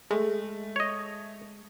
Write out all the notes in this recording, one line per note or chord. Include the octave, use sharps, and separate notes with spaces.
G#3 A3
C#5 D#5